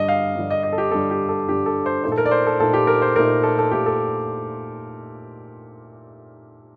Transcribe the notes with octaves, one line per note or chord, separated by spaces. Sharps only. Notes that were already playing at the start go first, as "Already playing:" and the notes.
Already playing: G2 D3 G3 D#5
F5
G2 D3 G3
D#5
D#5
A4
G4
G2 D3 G3 A4
G4
A4
G2 D3 G3 G4
A4
C5
A#2 A3 D#4 C5
A4
A#4
D5
C5
A4
A#2 A3 D#4 A4
G4
A#4
C5
A#2 A3 D#4 A#4
A4
A4
A#2 A3 D#4 G4
A4